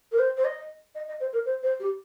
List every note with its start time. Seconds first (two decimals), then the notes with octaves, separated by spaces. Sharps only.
0.12 A#4
0.19 C5
0.37 C5
0.45 D#5
0.95 D#5
1.08 D#5
1.20 C5
1.33 A#4
1.46 C5
1.63 C5
1.80 G4